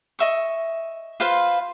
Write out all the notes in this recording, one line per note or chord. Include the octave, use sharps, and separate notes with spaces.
D#5 E5 C#6
F4 B4 C5 F5